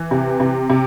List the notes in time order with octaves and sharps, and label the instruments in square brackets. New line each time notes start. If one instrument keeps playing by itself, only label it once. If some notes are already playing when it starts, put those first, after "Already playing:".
Already playing: [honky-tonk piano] E3
C3
C3
C3